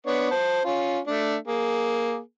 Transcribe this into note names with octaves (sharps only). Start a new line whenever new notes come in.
B3 D4 C#5
C5 A5
C#4 F4
A3 D4
A#3 G#4